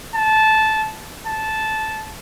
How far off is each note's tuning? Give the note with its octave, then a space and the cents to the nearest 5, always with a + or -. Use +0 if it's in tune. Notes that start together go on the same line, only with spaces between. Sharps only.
A5 -15
A5 -10